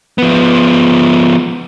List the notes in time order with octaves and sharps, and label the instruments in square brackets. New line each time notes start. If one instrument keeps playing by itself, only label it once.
[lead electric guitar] F3 B3